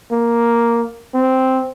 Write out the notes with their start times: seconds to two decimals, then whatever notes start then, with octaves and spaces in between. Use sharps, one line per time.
0.11 A#3
1.14 C4